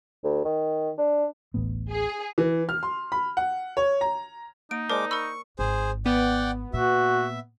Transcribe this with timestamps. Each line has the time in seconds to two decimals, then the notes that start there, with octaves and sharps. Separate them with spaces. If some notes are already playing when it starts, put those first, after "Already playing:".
0.24 D2
0.45 D#3
0.98 D4
1.54 D1 A1 B3
1.91 G#4
2.38 E3
2.69 F6
2.83 C6
3.12 B5
3.37 F#5
3.77 C#5
4.01 A#5
4.71 A#3 D#4 D7
4.90 G#3 A#4 C5 D5 A5 D6
5.11 A#4 B5 C#6 E6
5.59 G#1 G#4 C5
6.06 B3 D5 F#5 G5
6.73 A#2 F#4 E5